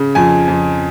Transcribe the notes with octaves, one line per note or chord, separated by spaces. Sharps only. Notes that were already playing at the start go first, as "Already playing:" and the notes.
Already playing: C#3
F2 G#5
F2